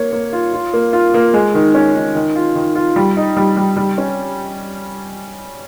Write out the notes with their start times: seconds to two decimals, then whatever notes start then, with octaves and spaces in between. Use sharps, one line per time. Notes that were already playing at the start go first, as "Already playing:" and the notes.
Already playing: A#3 C#5
0.13 A#3
0.33 F4
0.53 F4
0.73 A#3
0.93 F4
1.14 A#3
1.34 G#3
1.54 D#3
1.75 C#4
1.95 D#3
2.15 D#3
2.35 F4
2.55 D#3
2.75 F4
2.96 G3
3.17 D#4
3.37 G3
3.57 G3
3.77 G3
3.98 C#4